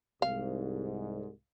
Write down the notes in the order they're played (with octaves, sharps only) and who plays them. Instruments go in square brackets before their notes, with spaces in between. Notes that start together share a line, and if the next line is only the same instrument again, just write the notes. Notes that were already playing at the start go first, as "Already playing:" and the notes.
[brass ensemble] C2 G#2 [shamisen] F5